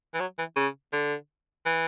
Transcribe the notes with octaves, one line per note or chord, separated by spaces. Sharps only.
E3
F#3
E3
C#3
D3
E3